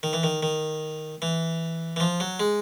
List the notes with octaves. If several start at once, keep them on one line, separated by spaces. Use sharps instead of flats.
D#3
E3
D#3
D#3
E3
E3
F3
F#3
G#3